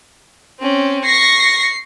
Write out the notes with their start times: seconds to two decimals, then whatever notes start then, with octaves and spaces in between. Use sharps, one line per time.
0.60 C4 C#4
1.04 C#6 A#6 C7